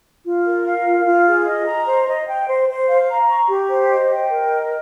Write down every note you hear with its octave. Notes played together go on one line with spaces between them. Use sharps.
F4
A#4
F5
F4
F4
G#4
D#5
A#5
C5
D#5
G5
C5
C5
F5
A#5
C#6
G4
C5
D#5
G5
A#4
D#5